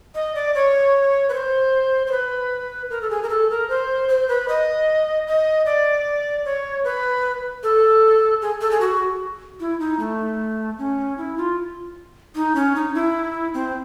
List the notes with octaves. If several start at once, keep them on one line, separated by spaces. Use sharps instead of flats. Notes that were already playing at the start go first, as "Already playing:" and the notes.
D#5
D5
C#5
B4
C5
C5
B4
A#4
A4
G#4
A#4
A4
A#4
C5
C5
B4
D#5
D#5
D5
C#5
B4
A4
G#4
A4
G#4
F#4
E4
D#4
A3
C#4
E4
F4
D#4
C#4
D#4
E4
C4